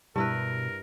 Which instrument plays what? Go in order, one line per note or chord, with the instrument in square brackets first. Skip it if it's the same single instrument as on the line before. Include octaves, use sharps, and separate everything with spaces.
[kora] G2 E4 B4 [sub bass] B2 [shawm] A#4